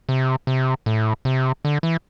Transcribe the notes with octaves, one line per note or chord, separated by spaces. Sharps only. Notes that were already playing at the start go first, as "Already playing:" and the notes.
C3
C3
A2
C3
D3
E3